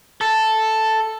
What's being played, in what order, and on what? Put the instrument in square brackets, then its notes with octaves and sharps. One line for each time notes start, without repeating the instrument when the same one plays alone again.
[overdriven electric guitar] A4